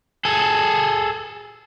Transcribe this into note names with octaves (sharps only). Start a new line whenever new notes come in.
G#4 A4